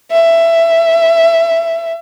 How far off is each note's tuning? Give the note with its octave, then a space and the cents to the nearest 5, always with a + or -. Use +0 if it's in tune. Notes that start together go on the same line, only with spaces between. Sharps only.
E5 +15